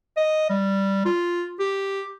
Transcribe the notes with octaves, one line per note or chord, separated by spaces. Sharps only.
D#5
G3
F4
G4